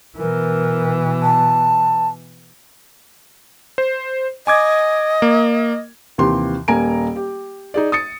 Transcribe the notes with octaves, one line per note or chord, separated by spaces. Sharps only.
B2 E3 A#4
A5
C5
D#5 G#5 D6 G#6
A#3
D#2 C3 E3 G4 C6
D#1 A#3 G#5 A#5 D7
G4
D#4 G#4 D5
D#6 A6 C#7